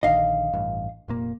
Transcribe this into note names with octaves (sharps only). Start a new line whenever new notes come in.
A#1 D3 D#3 D#5 F5
A1 G2
F1 A#2 A#3